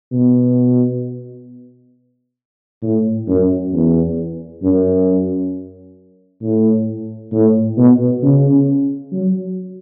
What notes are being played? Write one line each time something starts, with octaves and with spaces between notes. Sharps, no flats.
B2
A2
F#2
E2
F#2
A2
A2
B2
C#3
F#3